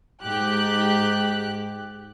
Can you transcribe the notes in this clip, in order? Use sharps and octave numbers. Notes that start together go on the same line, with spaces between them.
G#2 G4 F#6